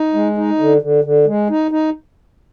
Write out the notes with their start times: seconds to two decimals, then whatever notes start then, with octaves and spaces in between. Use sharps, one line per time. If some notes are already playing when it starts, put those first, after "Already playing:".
Already playing: D#4
0.14 G#3
0.37 D#4
0.59 D3
0.82 D3
1.04 D3
1.27 G#3
1.50 D#4
1.71 D#4